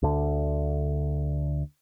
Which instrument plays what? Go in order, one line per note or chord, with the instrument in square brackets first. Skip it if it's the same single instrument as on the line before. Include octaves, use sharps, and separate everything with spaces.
[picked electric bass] D2 D3